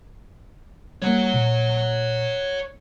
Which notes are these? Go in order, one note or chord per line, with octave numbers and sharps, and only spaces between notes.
G3 A#3 C#5 F#5
A#2